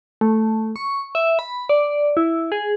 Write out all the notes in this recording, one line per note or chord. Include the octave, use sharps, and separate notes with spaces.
A3
C#6
E5
B5
D5
E4
G#4